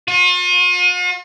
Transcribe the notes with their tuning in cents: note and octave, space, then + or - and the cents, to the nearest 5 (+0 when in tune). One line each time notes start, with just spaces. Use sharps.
F4 +45